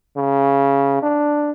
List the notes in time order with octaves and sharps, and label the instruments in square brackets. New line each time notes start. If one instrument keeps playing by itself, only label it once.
[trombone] C#3
D4